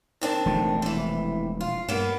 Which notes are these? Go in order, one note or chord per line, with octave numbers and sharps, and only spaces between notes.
D#3 C4 D4
E1 F3 A3
C3 E3
F4
G2 A#3 B3